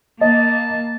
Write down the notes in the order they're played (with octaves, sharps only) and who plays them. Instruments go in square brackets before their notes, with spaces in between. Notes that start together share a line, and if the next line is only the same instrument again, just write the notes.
[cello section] A#3 [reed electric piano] D#5 [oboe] A5